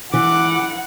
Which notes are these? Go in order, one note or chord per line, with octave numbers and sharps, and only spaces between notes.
E3 F#5 D6